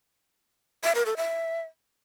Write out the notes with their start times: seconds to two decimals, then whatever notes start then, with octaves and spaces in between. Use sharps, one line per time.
0.84 E5
0.95 A#4
1.06 A4
1.17 E5